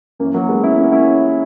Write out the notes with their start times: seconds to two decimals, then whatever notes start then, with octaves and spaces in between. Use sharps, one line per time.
0.19 F#2 E3 A#3 C#4
0.34 F#3 A#3
0.48 G#3 B3
0.63 C#4 E4
0.78 A#3 C#4
0.92 C#4 E4